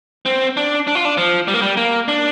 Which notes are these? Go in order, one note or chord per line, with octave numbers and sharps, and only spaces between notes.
C4
D4
D4
F4
D4
F3
G3
A#3
G3
A#3
D4